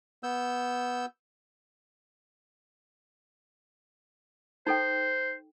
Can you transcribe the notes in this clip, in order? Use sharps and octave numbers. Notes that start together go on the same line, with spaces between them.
B3 E6 G6
D#4 A4 C5 G5